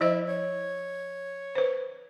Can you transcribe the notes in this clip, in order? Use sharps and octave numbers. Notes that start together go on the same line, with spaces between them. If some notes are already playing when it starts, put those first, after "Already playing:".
F3 E4 C5 D#5
C#5
B4 C5